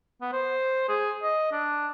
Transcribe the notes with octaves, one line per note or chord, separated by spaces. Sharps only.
B3
C5
G#4
D#5
D4